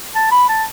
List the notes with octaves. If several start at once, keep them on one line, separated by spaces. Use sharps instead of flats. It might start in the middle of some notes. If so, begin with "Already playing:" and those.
A5
B5
A5